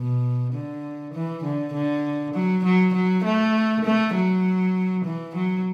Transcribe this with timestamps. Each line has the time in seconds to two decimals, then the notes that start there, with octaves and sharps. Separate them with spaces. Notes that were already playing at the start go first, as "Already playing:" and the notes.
Already playing: B2
0.53 D3
1.14 E3
1.44 D3
1.74 D3
2.34 F#3
2.64 F#3
2.94 F#3
3.24 A3
3.85 A3
4.15 F#3
5.05 E3
5.35 F#3